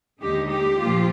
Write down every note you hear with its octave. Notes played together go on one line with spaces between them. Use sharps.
D#2 D3 G#3 D#4 G4
G4
A#2 F3 A#3 F4